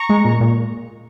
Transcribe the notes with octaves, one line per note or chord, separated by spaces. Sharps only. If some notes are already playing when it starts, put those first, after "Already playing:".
Already playing: A#5 C#6
G#3
A#2
A#2